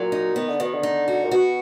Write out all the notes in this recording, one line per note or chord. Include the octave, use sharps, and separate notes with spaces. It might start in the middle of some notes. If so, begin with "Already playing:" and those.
Already playing: A#2 F#3
D#4
D#3 B3
D3
B2 D#3
D3
D#4
F#4
A#2
B2 F#4